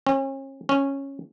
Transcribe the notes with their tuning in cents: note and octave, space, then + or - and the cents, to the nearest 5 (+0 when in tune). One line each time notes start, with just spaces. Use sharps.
C#4 -40
C#4 -10